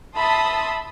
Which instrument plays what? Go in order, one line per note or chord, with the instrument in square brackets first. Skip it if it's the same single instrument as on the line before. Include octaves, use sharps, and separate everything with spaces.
[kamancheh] E5 B5 [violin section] A5 C6 D#6